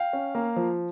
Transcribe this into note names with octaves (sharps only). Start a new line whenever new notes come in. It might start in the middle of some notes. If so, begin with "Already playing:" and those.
Already playing: F5 G5
C#4
A#3
F3